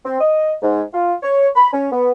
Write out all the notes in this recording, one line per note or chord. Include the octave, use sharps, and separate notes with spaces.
C4
D#5
G#2
F4
C#5
B5
C#4
B3